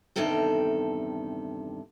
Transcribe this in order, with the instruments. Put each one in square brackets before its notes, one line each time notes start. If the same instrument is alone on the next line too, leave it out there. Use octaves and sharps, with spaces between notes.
[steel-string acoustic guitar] E2 G2 C3 D#3 A4 G5